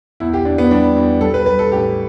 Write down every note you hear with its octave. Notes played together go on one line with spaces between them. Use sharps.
E2 E4
G4
E2 D4
B3
G3 D4
E2
G3 A4
B4
G3 B4
A4
A1 G4